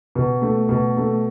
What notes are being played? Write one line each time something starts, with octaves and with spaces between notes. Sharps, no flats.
B2
A3
B2
A3